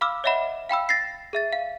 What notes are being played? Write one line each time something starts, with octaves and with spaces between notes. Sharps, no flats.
F5 B5 D6 E6 F6
C#5 D#5 E5 F#5 B5
F5 G5 B5 E6
A6 A#6 C7
G#4 E5 A6
F5